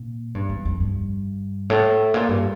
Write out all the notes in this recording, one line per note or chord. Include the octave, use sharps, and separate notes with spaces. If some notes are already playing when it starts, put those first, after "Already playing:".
Already playing: A#2
G2
E2
F2
G2
A2
A#2
G2